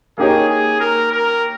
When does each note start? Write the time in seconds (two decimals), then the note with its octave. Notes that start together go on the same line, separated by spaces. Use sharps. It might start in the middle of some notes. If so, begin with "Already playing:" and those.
0.18 A#3 D#4 G4 G#4 C#5
0.49 G#4
0.80 A#4
1.11 A#4